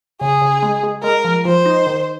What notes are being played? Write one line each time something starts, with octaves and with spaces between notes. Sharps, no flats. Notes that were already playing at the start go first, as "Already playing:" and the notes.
C#3 G#4
C#3
G#3
G#3
G#3 A#4
F3
F3 C5
D#4
D#3